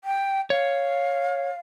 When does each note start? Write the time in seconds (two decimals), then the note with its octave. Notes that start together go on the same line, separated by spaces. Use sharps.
0.04 G5
0.50 C#5 F5